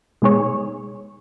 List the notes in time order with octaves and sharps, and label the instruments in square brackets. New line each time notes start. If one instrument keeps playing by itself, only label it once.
[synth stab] B2 G#3 D#4 G#4 C#5